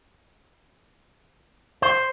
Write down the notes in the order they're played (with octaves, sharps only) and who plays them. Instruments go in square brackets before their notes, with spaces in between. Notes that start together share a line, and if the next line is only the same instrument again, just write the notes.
[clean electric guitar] C5